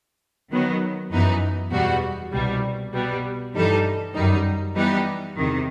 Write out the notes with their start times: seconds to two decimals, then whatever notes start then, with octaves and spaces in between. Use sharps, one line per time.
0.50 D#3 F#3 B3
1.11 F#2 E3 B3 D#4
1.71 E2 B2 G3 B3 F#4
2.33 C2 B2 G3
2.93 B2 G3 B3
3.54 G2 E3 G3 D#4 A4
4.14 F#2 D#3 G3 D#4
4.74 E3 G3 B3 D#4 G4
5.35 E2 C3 D#3